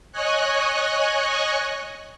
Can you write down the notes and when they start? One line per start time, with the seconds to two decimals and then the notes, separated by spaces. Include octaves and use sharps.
0.12 C#5 D#5 G#5 C#6 F#6